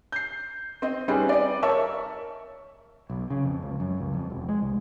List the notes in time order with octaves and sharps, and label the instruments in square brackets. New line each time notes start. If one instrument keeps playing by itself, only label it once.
[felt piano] G6 C7
C4 D#5
G3 C4 C#4 D#4 G#4 B4
D5 D#5
A#4 C#5 E5 A5 C#6 E6
[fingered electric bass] B1
C#3
F2
C#2
F#2
C#2
F2
E1
G#3
C2